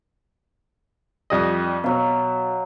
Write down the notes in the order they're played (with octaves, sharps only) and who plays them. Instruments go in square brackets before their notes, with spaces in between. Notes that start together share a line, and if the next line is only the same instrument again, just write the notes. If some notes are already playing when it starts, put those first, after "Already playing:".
[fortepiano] F2 G3 D#5
[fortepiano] B2 [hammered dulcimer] F#3 F5